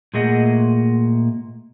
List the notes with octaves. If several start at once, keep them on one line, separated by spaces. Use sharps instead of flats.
A#2 A3 G#4 D#5 F#5